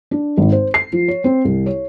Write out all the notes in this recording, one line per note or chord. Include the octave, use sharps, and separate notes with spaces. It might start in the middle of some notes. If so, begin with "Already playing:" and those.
D4
G#1
C5
C7
F3
C#5
C4
C2
C#5